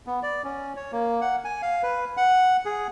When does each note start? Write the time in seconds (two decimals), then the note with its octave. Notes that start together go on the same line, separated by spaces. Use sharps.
0.07 B3
0.23 D5
0.44 C#4
0.77 C#5
0.92 A#3
1.21 F#5
1.45 G#5
1.62 F5
1.83 B4
2.17 F#5
2.65 G#4